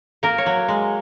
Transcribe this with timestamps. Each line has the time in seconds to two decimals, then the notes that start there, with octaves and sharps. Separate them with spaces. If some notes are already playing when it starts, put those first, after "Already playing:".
0.23 A#3 A#4
0.38 C#5
0.46 F#3
0.68 G#3